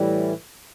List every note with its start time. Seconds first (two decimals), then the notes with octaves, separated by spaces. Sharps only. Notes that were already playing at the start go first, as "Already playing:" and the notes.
Already playing: A2 E3 G3